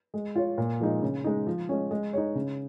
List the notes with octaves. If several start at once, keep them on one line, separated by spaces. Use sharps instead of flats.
G#3
F4 C#5
A#2
F3 G#3 D#4 G#4
C#3
G#3 D#4
F3
G#3 C#4
G#3
D#4 G#4 C#5
C#3